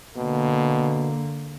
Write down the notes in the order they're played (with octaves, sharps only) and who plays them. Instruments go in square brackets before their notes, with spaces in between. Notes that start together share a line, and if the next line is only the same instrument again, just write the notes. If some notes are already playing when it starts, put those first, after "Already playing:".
[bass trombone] B2 [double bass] D3 A#3